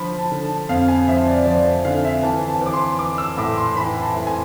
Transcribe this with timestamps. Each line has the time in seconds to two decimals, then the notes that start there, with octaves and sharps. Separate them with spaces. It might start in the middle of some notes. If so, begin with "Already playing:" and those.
Already playing: D3 F3 B5
0.18 A5
0.32 D3
0.44 A5
0.69 F2 F5
0.88 G#5
1.08 F3 E5
1.28 D5
1.46 F3 D5
1.85 D3 F5
2.04 E5
2.23 E3 A5
2.48 A5
2.61 E3 D6
2.73 C6
2.99 E3 D6
3.18 E6
3.38 A2 D6
3.58 C6
3.75 E3 B5
4.01 A5
4.14 A2
4.27 G#5